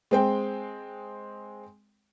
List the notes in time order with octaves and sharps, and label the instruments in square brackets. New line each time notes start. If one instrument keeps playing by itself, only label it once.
[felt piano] G#3 C4 G5